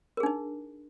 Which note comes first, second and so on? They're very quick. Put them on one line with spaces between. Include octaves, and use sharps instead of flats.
A#4 G#4 D4 D#4